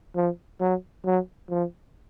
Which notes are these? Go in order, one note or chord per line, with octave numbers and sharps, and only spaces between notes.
F3
F#3
F#3
F3